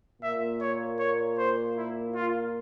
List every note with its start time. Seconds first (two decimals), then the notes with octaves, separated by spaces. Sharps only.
0.22 A#2 A#3 E5
0.61 C#5
0.99 C#5
1.38 C5
1.77 E4
2.15 F4